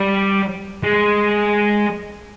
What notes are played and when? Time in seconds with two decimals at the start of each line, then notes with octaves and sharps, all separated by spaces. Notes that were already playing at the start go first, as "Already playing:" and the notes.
Already playing: G3
0.83 G#3